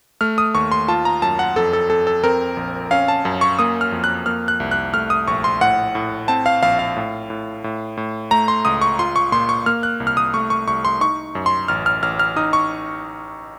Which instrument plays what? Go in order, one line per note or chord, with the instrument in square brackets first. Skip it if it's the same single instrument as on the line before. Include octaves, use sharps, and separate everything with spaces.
[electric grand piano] A3 F6
D#6
D#2 C#6
C6
F4 A5
A#5
F#2 A5
F#5
F2 A4
A4
F2 A4
A4
C4 A#4
A#1
C#4 F5
A5
F#2
C#6
A#3 D#6
F6
F2
F#6
A#3 F6
F#6
C2
F#6
A3 F6
D#6
A#1 C#6
C6
A2 F#5
A2
C4 A5
F5
A#1 F5
F5
A2
A2
A2
A2
A3 A#5
C6
C#2 D#6
C#6
F4 C6
C#6
A#2 C6
C#6
A#3 F6
F#6
C2
F6
D#6
A3 C#6
C#6
C2 C#6
C6
D#4 C#6
F#2
C6
A1 F6
F6
A1 F6
F6
D#4 D#6
C#6